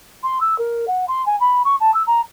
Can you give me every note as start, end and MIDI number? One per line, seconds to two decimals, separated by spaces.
0.23 0.39 84
0.41 0.57 88
0.58 0.85 70
0.87 1.05 78
1.08 1.25 84
1.26 1.38 80
1.40 1.62 83
1.64 1.76 85
1.80 1.94 81
1.94 2.03 88
2.07 2.21 82